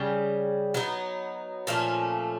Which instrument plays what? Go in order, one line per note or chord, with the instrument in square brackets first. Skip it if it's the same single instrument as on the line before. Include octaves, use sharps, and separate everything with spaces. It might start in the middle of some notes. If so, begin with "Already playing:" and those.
Already playing: [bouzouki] C#3 G3
F#3 B3 D#4
A#2 F3 A3 C#4